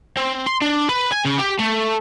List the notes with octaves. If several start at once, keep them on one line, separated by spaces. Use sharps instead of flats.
C4
C6
D4
B4
G#5
C#3
G4
A3